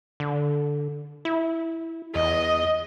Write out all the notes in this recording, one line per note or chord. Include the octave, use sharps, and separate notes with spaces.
D3
E4
E2 D#5